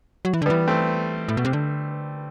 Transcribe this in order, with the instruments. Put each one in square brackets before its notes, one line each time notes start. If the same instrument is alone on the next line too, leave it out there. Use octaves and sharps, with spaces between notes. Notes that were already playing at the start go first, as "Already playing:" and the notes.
[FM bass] F#3
E3
D3
[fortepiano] G3 B3
[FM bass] E3
[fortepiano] A3 C4
[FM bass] A2
B2
C3
D3